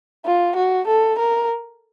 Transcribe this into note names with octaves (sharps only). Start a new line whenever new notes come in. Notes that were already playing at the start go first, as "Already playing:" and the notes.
F4
F#4
A4
A#4